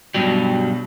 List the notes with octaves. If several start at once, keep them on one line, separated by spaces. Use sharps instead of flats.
G2 B2 F#3 G3